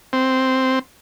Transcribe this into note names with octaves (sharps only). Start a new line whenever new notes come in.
C4